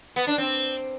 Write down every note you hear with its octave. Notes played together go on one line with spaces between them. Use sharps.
B3
D4
C4